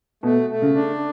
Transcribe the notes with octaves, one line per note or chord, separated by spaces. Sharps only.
B2 A3
A3
C#3
D4